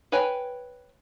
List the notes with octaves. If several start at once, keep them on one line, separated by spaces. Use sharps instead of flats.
B4 C#5 G5 G#5